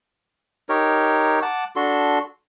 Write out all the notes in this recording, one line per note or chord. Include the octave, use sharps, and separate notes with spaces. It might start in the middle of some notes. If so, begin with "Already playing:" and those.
D#4 G4 A#4 C#5
F#5 A5 D6
D4 F#4 A4 C6